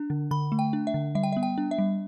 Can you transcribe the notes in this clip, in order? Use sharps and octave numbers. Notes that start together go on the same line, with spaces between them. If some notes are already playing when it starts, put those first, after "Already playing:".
Already playing: D4
D3
D3 B5
A3
G5
D4
E5
D3
G3 E5
G5
E5
B3
G5
D4
E5
G3